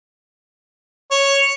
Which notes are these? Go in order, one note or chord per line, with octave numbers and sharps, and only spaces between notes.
C#5